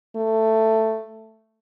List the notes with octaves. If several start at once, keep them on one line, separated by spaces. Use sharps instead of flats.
A3